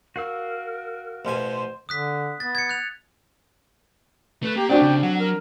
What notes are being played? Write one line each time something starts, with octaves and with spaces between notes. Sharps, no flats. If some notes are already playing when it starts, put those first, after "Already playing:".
F#4 A#4 F5 E6
A1 B2 C5 G#5
D3 D#6 F#6 B6
B3 A6
G#6 C#7
F#6 F7
A3 A4 B4
A#3 G4
A3 C4 D4 F#4 D5 G5
C#3
F#3 F#5
A#4